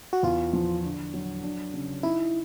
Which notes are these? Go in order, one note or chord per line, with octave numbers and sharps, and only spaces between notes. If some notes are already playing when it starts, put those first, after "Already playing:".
F#4
E2 F4
F3
D3
F#3
D4
C#3
D#4 E4